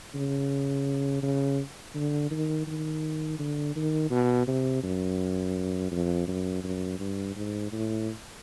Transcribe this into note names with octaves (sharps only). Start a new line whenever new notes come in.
C#3
C#3
D3
D#3
D#3
D3
D#3
B2
C3
F#2
F2
F#2
F#2
G2
G#2
A2